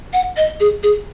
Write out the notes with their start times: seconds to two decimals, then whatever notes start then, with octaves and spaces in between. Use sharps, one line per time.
0.13 F#5
0.37 D#5
0.60 G#4
0.83 G#4